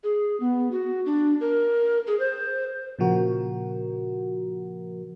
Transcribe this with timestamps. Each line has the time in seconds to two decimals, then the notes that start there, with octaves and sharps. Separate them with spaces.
0.04 G#4
0.40 B3
0.71 F#4
1.06 D4
1.41 A#4
2.07 G#4
2.19 C5
2.99 A#2 C#3 F3 F#4 A#4